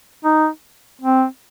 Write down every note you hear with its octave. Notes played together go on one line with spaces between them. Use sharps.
D#4
C4